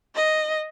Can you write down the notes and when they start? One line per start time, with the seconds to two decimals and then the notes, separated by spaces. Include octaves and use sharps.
0.15 D#5